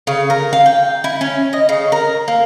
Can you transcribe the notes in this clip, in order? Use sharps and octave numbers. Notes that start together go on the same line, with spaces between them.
C#3
A#4
F5
G5
E4
C#4
D#5
C#3
A#4
A#3